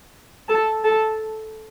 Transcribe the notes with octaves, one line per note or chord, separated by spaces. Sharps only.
A4 A5
A4 A5